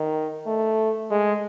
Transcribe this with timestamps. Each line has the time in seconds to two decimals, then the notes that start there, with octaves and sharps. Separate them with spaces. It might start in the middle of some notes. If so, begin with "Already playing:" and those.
Already playing: D#3
0.46 A3
1.11 G#3